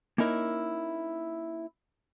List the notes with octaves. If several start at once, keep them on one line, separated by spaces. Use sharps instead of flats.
A#3 C#4 D#4 E4 A#4